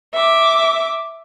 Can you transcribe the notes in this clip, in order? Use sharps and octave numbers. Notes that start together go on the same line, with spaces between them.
E5 D6